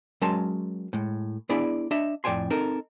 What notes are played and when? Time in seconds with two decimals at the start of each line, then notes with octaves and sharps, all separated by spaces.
0.22 F#3 G#3 C#4 A#4 A5 C6
0.93 A2 G#3
1.49 B3 D4 E4 G#4 D5 B5
1.91 D4 D#5 E5
2.24 F2 A2 D5 G5 G#5 C6
2.50 C4 D#4 A4 A#4